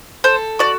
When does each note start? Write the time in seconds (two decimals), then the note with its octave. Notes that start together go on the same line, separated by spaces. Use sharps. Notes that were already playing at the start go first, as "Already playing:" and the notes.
0.24 A4 C5
0.59 F#4 D5